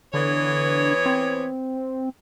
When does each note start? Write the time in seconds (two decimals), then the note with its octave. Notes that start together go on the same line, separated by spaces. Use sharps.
0.14 D3 E3 B3 C#5
1.06 C4